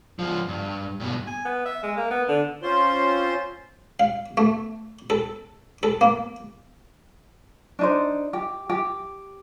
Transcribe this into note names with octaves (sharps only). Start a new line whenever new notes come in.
C#2 F3
G2
G2 B2
G#5
B3
E5
G#3
A#3
B3
D3
C4 C#4 F4 C5 C6
F5
A3
A4
A4
A#3
D4 D#4 C5
G4
G4